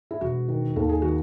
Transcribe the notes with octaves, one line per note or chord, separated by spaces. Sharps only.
E4
E1 F#4
D#3
D#2 A4
G#4
D#3 F#4